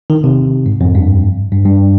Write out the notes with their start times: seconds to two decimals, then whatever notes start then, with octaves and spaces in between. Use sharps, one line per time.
0.10 D#3
0.24 C3
0.66 G#2
0.81 F2
0.95 G2
1.52 G2
1.66 G2